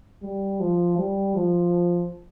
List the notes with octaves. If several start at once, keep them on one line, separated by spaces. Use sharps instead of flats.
G3
F3
G3
F3